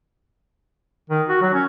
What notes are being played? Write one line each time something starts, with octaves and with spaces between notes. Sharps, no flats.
D#3
F#4
F#3
C#4